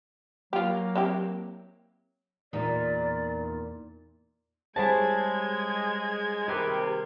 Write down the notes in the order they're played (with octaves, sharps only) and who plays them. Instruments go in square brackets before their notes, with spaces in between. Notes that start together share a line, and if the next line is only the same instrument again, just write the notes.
[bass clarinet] F#3 [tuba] A#3 [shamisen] F4 G4
[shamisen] C4 E4 G4
[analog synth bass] E2 [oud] A#2 D#4 [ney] D5
[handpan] G3 C5 C#5 [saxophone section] G#3 [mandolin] E4 G#4 A5 [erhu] G#6
[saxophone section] C3 D#3 [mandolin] G4 B4 C6 [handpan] G#4 A#4